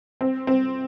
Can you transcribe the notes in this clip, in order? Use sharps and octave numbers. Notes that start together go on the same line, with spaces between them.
C4
C4